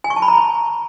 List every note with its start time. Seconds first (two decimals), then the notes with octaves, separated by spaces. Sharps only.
0.04 G#5
0.10 C#6
0.16 A5
0.22 B5
0.28 A#5